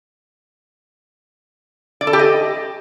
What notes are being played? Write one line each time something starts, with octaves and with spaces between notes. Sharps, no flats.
D5
A4
G4
D#5